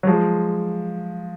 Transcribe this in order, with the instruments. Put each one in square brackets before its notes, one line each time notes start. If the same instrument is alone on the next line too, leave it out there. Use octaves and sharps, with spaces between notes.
[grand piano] F#3
F3 G#3